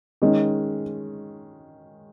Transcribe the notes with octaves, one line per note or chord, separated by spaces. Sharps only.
D#3 G#3 C#4